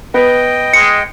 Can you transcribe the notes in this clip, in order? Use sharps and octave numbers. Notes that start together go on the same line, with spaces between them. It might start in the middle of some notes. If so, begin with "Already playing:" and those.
B3 D#5 G5
G#3 C#7